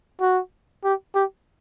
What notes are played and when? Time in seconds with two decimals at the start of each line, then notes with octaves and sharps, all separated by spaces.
0.21 F#4
0.84 G4
1.15 G4